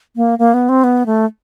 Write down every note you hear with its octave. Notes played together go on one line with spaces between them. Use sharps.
A#3
A#3
B3
C4
B3
A3